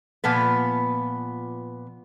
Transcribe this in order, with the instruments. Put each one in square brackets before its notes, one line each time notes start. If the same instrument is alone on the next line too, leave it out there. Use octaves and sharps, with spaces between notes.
[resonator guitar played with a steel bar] A#2 F3 B3 B4